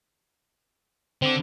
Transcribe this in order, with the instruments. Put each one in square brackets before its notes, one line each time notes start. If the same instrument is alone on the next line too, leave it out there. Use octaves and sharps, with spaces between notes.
[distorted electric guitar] D3 [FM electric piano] C4 D6